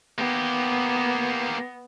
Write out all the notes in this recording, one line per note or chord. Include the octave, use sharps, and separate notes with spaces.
A#3 B3 G4